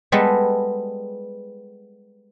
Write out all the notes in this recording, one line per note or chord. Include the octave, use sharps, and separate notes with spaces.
G3 G#3 B3 A4 B4